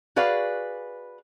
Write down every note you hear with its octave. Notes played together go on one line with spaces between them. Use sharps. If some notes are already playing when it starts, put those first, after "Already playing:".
F#4 G#4 B4 D5 F5